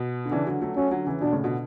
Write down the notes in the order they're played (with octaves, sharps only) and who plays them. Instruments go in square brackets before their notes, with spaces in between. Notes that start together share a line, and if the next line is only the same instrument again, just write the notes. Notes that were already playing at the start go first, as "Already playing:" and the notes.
Already playing: [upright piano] B2
D3
[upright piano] C#3 E3 [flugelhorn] D4
[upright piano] D3 F#3
F#3 A3
[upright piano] F#3 A3 [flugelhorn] C#4
[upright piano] D3 F#3
C#3 E3
[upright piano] B2 D3 [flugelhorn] D4
[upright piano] A2 C#3
B2 D3